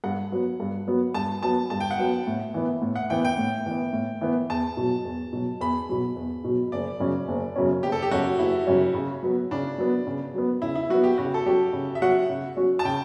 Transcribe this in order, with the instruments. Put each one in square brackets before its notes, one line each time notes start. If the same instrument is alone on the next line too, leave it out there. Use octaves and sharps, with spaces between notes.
[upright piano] G2 [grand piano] F#5
[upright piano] F#3 B3
G2
F#3 B3
[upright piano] G2 [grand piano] A5
[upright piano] F#3 B3 [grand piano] A5
[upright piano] G2 [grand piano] A5
[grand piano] G5
F#5
[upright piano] F#3 B3 [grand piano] G5
[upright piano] A2
E3 B3
A2
[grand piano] F#5
[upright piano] E3 B3 [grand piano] G5
[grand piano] G5
[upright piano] A2
E3 B3
A2
E3 B3
[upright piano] E2 [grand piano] A5
[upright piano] B2 F#3
E2
B2 F#3
[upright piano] E2 [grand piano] B5
[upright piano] B2 F#3
E2
B2 F#3
[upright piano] F#1 [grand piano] D5
[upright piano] F#2 C#3 F#3 C#4
F#1
F#2 C#3 F#3 C#4
[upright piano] F#1 [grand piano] G4
[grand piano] A4
G4
[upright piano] F#2 C#3 F#3 C#4 [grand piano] F#4
[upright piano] F#1 [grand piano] E4
[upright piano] F#2 C#3 F#3 C#4
C#3
F#3 B3
[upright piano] C#3 [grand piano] D4
[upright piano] F#3 B3
C#3
F#3 B3
[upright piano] C#3 [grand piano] E4
[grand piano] E4
[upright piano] F#3 [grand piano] F#4
[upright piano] B3
[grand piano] G4
[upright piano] C#3 [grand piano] F#4
[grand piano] A4
[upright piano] F#3 C#4 F#4 [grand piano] G4
[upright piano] C#3
[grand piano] E5
[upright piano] F#3 C#4 F#4 [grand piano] F#5
[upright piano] C#3
F#3 C#4 F#4
[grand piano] A5
[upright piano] C#3 [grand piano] G5